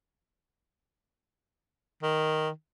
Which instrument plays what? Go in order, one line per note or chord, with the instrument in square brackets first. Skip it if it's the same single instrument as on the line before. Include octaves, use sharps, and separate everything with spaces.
[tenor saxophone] D#3